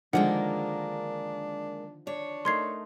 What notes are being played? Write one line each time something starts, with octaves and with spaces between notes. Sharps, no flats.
D3 D#3 F3 G#3 A#3 D4 A#4 F#5
D4 C#5
A3 D#4 A#4 C6 G#6 C7